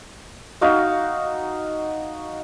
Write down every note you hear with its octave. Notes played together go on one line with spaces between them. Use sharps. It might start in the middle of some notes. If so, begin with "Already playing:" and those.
D#4 F#4 F5